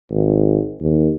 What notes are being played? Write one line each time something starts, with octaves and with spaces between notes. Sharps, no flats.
G#1
D#2